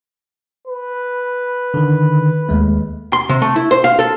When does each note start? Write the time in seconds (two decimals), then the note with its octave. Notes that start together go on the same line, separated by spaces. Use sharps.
0.67 B4
1.74 D3 D#3
2.49 D#2 G#3 A3
3.13 C6
3.29 C3
3.42 A3
3.56 E4
3.71 C5
3.84 F5
3.99 A4